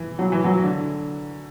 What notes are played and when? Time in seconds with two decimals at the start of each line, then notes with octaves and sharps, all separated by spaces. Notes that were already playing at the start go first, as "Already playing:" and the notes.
Already playing: E3
0.19 F#3
0.32 E3
0.44 F#3
0.63 D3